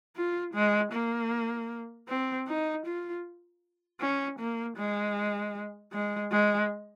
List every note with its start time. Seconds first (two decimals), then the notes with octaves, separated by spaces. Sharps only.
0.16 F4
0.54 G#3
0.92 A#3
2.08 C4
2.47 D#4
2.85 F4
4.01 C#4
4.39 A#3
4.77 G#3
5.92 G#3
6.32 G#3